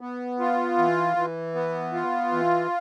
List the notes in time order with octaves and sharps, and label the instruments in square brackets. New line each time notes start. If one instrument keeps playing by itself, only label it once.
[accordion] B3
F4
E3
E3
B3
F4
E3